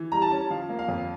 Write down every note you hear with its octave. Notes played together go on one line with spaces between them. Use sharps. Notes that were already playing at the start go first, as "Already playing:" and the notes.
Already playing: E3
G3 A#5
A5
C#4
F3 F5
A#3
F5
F2